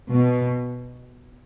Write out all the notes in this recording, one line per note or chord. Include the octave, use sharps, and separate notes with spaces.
B2